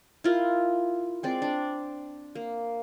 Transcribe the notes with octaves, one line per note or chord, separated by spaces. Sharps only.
E4 F4 A#4
G#3 C4 D5
D4
A#3